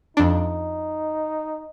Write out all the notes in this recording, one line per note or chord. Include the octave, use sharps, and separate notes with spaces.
F2 D4 D#4